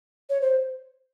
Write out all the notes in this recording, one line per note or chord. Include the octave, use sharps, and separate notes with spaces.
C#5
C5